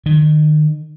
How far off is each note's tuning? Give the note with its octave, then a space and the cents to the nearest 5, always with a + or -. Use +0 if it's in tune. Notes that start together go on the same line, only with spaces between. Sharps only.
D#3 -35